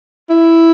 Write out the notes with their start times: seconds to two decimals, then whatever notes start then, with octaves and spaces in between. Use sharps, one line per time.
0.29 E4